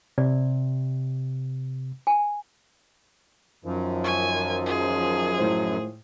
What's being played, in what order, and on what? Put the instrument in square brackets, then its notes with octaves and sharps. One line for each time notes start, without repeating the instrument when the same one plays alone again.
[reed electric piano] C3 [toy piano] D5
[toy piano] G#5
[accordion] F#2 [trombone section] D#3 F3
[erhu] G#5 [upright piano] C#6
[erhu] G#4
[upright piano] A2 C5